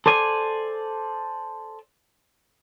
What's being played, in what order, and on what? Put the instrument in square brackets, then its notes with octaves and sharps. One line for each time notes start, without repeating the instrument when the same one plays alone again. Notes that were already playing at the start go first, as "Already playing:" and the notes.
[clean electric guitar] A4 C5 D5 G#5